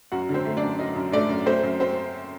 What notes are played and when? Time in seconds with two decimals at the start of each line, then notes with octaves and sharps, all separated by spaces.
0.12 F#2 F#4 F#5
0.29 D3
0.34 C4 C5
0.45 A3
0.57 D4 D5
0.63 F#2
0.79 F#2 D#4 D#5
0.96 F#2
1.12 A3 D4 D5
1.29 F#2
1.46 A3 C4 C5
1.63 F#2
1.80 C4 C5